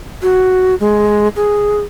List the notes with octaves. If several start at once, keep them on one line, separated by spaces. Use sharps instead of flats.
F#4
G#3
G#4